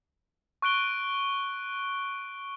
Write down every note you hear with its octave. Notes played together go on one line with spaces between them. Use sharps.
C#6 F#6 D7 G7